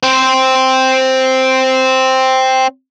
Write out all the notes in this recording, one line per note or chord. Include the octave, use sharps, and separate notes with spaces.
C4 C5